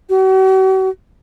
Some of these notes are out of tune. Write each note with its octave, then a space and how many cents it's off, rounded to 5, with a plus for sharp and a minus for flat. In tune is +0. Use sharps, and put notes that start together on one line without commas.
F#4 +45